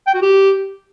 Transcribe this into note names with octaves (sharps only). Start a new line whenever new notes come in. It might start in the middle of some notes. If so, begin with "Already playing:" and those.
G5
F#4
G4